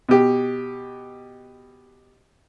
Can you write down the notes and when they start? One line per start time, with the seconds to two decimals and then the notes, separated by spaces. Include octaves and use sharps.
0.09 B2 G4